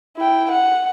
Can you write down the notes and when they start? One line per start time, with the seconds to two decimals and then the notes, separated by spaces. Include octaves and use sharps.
0.17 E4 G5
0.51 F#5